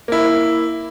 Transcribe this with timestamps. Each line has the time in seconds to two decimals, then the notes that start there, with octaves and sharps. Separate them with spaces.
0.08 A#3 E4